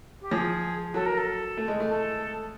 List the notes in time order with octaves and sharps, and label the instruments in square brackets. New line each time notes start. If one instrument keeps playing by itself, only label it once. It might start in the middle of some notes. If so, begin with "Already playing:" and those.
[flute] G4
[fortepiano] F3 [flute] G#4
[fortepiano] F#3 [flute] A4
[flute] A#4
A4
[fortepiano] A3
G#3
A3
[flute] A4